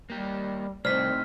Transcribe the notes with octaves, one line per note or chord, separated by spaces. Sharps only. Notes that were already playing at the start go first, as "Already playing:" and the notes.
G3 A#3 G4
C2 A2 C4 D#4 C5 D5 F6 B6